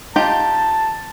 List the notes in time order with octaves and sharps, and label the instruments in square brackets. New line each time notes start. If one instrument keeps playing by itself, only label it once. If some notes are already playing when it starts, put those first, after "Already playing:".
[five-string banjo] D#4 F4 G4 [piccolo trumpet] A5